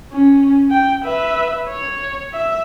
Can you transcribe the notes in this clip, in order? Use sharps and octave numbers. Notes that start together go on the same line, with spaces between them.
C#4
G5
B4 E5
C#5
E5